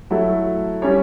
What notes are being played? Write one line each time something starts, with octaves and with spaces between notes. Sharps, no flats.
F#3 A3 E4 A4
G3 C#4 G4 C#5